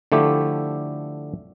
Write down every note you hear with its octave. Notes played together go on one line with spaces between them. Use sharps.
D3 F3 A3 E4 G4